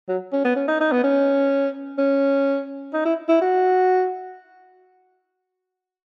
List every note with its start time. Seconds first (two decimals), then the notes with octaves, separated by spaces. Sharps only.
0.09 F#3
0.33 C#4
0.45 B3
0.56 C#4
0.68 D#4
0.80 D#4
0.92 B3
1.04 C#4
1.98 C#4
2.93 D#4
3.05 E4
3.29 E4
3.41 F#4